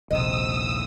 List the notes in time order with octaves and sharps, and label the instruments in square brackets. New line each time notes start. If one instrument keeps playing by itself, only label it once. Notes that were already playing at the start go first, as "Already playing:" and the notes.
[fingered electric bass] D#1 A#1 [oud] C3 D#5 [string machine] D#6 E6